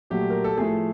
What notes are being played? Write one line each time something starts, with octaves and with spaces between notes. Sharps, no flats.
A#2 F#3 A3 G4
A#4
A4
A2 F3 A3 G#4